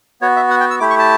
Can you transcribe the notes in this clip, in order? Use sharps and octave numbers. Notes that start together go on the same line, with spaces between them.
B3 F#4 C#5
E5
F#5
G5
E6
A3 E4 G4 D6
C#6
A5